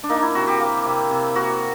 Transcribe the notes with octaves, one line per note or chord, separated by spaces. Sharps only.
D4
A#3 D#4
E4
C3 F#4
G4
A#3
C3
C3
A#3 F#4